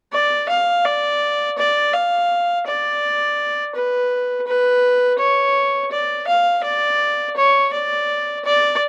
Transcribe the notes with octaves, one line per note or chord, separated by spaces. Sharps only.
D5
F5
D5
D5
F5
D5
B4
B4
C#5
D5
F5
D5
C#5
D5
D5